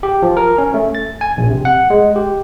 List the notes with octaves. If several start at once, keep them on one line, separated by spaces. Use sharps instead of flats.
G4
F3
A#4
C#4
A3
A6
G#5
A#1
C3
F#5
G#3
G4